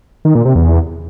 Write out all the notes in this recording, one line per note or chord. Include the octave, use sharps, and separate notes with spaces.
D#3
A#2
C3
E2